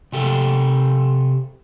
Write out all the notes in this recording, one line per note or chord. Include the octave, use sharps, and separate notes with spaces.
C3 G4 A4